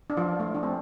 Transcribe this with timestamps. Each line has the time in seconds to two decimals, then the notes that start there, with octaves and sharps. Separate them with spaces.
0.10 D4
0.17 F3 F4
0.40 A3
0.55 D4
0.63 C4